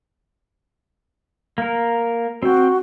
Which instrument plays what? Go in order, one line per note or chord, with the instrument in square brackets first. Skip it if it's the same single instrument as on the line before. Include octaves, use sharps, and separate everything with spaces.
[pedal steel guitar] A#3 A#4
[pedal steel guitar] C4 G5 [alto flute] F#4